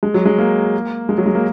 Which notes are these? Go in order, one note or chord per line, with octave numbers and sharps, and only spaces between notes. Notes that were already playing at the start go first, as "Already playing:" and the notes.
G#3
F#3
G#3
A#3
G#3
F#3
G#3
A#3